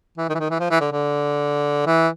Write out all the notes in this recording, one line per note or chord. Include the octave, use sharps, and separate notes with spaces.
E3
D#3
E3
D#3
E3
F3
E3
D3
D3
E3